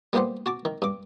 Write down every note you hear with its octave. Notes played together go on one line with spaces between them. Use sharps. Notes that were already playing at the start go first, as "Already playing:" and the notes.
G3 A#3 B3 G4 C5 F#5
F#4 A5 D6
D#3
G2 D6